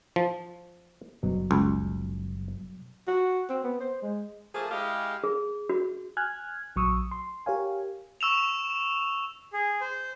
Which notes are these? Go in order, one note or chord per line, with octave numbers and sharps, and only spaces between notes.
F3
F#1 B2 F#3 G3 D4
C#2
F#4
C4
B3
C5
G#3
F3 A3 A#3 F4 G#4
G#3 E4 G4 G#4 F5
G#4
F#4
G#5 F6 F#6 G#6
A#1 F#3 C#6 D#6 E6
C6
G4 A#4 C#5 F5 G#5
C#6 E6 E7 F7
G#4
C5